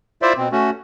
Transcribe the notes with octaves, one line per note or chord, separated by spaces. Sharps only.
E4 F4 C5 D5 E5
B2 C4
A3 C#4 F#4